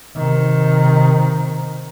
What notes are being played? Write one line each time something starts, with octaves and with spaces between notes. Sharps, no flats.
C3 D#3